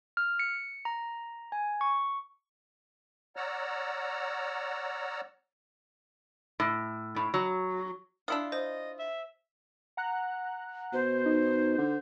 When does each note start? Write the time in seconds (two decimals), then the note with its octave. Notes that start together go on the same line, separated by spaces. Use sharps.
0.17 F6
0.39 C#7
0.85 A#5
1.52 G#5
1.81 C#6
3.36 C#5 D5 F#5 A#5 E6 F6
6.60 A2
7.16 A2
7.34 F#3
8.28 D4 E4 F4 D#6 E6
8.52 C5 D#5
8.99 E5
9.97 F#5 A#5 F#6
10.93 B2 C5
11.26 D#4
11.78 D3